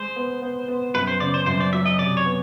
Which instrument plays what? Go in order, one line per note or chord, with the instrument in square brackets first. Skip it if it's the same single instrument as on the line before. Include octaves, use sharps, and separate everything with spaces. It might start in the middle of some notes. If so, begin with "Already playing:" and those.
Already playing: [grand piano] G#3 [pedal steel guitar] C5
[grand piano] B3
B3
B3
[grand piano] F#2 [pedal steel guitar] B4
[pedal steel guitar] C5
[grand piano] C#3 [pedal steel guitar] D5
[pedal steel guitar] C5
[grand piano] F#2 [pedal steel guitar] C5
[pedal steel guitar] D5
[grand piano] F#3 [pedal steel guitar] E5
[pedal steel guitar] D#5
[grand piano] C3 [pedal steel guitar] D5
[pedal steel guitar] C#5
[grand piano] B3